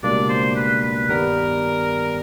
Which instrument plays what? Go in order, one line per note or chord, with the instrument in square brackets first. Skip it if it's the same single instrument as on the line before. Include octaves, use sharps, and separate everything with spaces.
[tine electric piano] C#2 B2 G3 A#3 D4 [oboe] D5
[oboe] C5
B4
B4
[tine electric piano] G2 D#3 G3 B3 [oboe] A#4